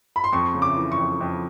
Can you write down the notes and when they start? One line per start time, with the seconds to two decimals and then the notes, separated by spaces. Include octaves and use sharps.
0.16 B5
0.24 C6
0.33 F2 C#6
0.54 C#3
0.62 D6
0.77 E3
0.92 C#6
0.98 F2
1.21 F2